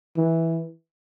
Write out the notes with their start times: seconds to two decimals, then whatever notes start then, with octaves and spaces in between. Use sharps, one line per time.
0.17 E3